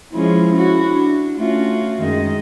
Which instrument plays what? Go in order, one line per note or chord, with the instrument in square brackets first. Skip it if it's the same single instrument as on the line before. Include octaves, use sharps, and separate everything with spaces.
[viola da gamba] F3 G#3 C#4 [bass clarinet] E4
[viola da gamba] C#4 F#4
D4
[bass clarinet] A3 [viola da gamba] C#4 F4 F#4
[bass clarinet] F#2 [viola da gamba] D#3 G#3 D#5